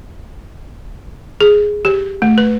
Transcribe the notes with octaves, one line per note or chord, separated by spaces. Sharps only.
G#4
G4
A3
B4